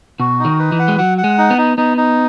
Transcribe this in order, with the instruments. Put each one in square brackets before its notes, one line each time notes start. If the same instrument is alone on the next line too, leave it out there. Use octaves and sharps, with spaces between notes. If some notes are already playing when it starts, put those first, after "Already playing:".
[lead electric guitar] B2 [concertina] F#4
[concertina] D#4
[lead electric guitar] D#3
[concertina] B4
[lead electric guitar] E3
[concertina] F#5
[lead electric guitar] G#3
[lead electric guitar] F#3 [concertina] F#5
[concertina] F#5
[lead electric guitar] G#3
[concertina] D#4
[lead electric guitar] B3
[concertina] D#4
[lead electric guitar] B3 [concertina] D#4
[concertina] D#4